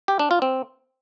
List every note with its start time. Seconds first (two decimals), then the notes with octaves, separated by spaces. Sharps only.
0.08 G4
0.19 D4
0.31 F4
0.42 C4